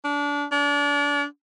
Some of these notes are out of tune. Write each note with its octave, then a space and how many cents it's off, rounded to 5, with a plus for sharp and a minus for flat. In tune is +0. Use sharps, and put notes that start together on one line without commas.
D4 -25
D4 -30